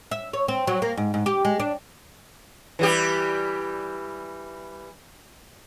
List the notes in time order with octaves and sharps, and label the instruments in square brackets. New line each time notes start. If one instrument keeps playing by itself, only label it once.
[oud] E5
C#5
C4
F#3
A#3
G#2
G#2
G4
G#3
D4
[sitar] E3 G3 G4